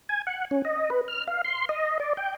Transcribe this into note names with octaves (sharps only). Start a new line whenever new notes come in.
G#5
F#5
C#4
D#5
B4
F6
F5
C6
D#5
D5
G5